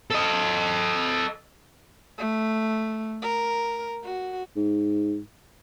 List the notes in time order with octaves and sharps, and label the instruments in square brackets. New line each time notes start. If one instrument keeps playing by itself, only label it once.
[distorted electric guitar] A4 D#5
[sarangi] A3
A#4
F#4
[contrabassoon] G#2